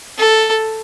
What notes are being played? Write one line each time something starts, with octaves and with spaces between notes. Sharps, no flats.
A4